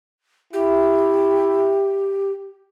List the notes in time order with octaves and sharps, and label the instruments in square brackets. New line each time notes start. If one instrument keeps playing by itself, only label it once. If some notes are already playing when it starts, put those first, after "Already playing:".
[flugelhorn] E4 [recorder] G4